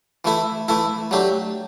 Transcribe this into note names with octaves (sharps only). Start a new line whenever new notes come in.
E3 A3 E4 A4
E3 A3 E4 A4
F#3 A3 D4 G4